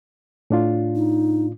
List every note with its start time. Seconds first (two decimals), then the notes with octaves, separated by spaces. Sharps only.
0.50 A2 D4 F4
0.96 D#4